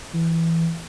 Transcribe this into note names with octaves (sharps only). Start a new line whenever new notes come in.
E3